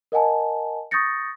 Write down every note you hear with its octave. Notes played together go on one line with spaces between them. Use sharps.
A#4 D#5 F#5 G#5 A5
C#6 D#6 G6 A6 A#6 C#7